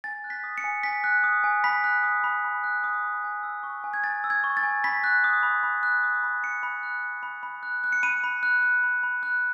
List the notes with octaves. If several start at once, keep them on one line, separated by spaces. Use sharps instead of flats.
G#5 A6
F#6
B6
D#6
C#7
G#5
G#5 B6
F#6
D#6
G#5
B5 B6
F#6
D#6
B5
B5
F#6
D#6
B5
G#5
E6
C#6
G#5
G#6
G#5 A6
E6
G#6
C#6
A6
G#5
B5 B6
F#6
D#6
B5
B5
F#6
D#6
B5
B5 C#7
B5
F#6
F#6
B5
B5
F#6
F#6
C#7
B5 D#7
B5
F#6
F#6
B5
B5
F#6